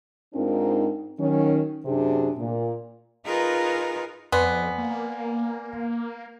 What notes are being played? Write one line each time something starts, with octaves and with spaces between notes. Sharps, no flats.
G#2 C4 D4 D#4 F4 A#4
D#3 F#3 C#4
F#2 C3 C4 D4 G#4
A#2
D#4 F4 G#4 A#4 B4
F2 B3 D5 G#5 C6
A#3